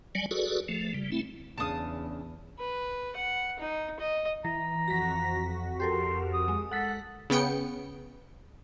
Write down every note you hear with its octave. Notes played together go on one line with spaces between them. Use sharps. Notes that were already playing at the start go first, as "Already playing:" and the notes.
F#3 G3 D5 G#5
F#4 G#4 A4 B4 D5
F3 A3
C#3 G3
A3 C4 E4
E2 C#3 D4 F5 A5 D#6
B4
F#5
D#4
D#5
E3 A#5
F2 F#4 A#6 B6
G4 A4 A#4 C6
D#6
G#3
A4 F#5 B6
C#3 B3 G5 C#7